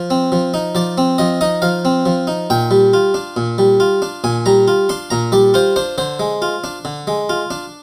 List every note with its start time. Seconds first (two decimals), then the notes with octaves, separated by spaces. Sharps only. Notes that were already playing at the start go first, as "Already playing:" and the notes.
Already playing: F3
0.10 C4
0.32 F3
0.54 D#4
0.75 F3 D5
0.98 C4
1.18 F3 D#5
1.41 D#4 D#5
1.62 F3 F5
1.85 C4
2.06 F3
2.27 D#4
2.50 A#2 G5
2.71 G3
2.93 F4
3.14 D4
3.37 A#2
3.58 G3
3.80 F4
4.02 D4
4.24 A#2 G#5
4.46 G3 A#5
4.68 F4
4.89 D4 C6
5.10 A#2 A#5
5.32 G3 D5
5.54 F4 C5
5.76 D4 C5
5.98 D3 C5
6.20 G#3
6.42 F4
6.64 D4
6.85 D3
7.07 G#3
7.29 F4
7.51 D4